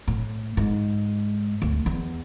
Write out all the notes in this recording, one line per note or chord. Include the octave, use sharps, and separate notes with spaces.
A2
G#2
D2
E2